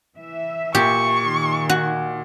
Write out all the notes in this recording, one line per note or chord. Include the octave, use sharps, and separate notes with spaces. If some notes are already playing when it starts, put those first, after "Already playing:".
E3 E5
A#2 G4 C#6
D#3
F#4